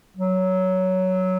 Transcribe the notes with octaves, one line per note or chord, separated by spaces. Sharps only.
F#3